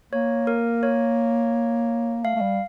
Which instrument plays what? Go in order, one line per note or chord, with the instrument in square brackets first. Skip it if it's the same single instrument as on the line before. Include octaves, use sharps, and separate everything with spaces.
[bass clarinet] A#3 [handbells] C#5
[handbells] A#4
C#5
[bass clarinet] A3 [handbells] F5
[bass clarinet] A3
G3